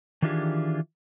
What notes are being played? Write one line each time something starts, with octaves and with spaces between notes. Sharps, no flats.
D#3 E3 D4 F4 G4 G#4